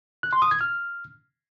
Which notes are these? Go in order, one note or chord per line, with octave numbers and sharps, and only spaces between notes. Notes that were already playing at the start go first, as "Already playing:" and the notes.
F#6
C6
D#6
G#6
F6